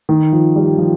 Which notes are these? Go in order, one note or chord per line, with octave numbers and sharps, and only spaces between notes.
D#3
F3
G3
F3